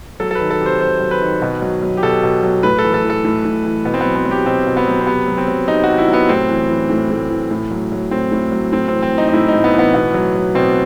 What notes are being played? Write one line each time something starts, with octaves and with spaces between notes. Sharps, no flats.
F#3 A4
A4
B4
D#3
A4
C3
C5
C3 C5
F#3
B4
D#3
B2
F#3
F#3
G4
B2 A4
B2
F#3
A2 B4
A4
E3
A4
E3
A4
A2
A2
E3
B2 B3
C4
F#3 B3
C4
F#3
G4
B2 C4
B2
B3
F#3
C4
C3 B3
F#3
C4
F#3
C3 D#4
C3 F#4
E4
F#3
B3
A2 C4
E3
E3
A2
A2
E3
A2
F#3
F#3
A2 C4
A2
F#3
A2 C4
E3 C4
C4
E3
D#4
D#4
A2 E4
D#4
A2
B3
E3 B3
B2 B3
F#3
F#3
B2 C4